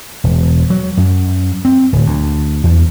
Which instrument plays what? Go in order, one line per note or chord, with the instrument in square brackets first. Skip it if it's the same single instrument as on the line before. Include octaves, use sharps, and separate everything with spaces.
[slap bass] E1
F#3
F#2
C4
D1
D2
E2